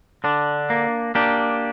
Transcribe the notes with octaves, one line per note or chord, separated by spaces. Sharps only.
D3 D4
A#3
A#3 D4 G4